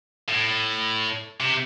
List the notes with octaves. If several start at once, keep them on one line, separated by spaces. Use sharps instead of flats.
A2
C3